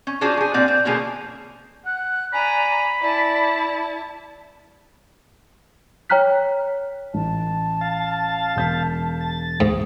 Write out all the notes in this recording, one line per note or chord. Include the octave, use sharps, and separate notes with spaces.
C#4
C#4 D4 F4 F#4 G#4 C5
F3 G#4
A#2 G3 C4 D5 F#5
C4
B2 D3 F3 A#3 C#4 G#4
F#5 F#6
D5 G#5 A#5 B5
E4 D5 A5
C#5 G5 A#5 F6 F#6 B6
A1 A5
F5 A6
E1 G6 B6
A6
D2 G#2 G#4